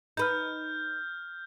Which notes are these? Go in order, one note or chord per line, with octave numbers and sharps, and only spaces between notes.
D#4 B4 F6 G6